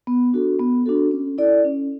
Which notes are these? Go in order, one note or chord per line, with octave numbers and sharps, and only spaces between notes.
B3
D4 F#4 A4
B3
D4 F#4 A4
C#4
E4 A4 D5
C#4